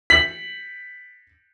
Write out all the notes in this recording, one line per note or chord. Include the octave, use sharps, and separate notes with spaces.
B6 F#7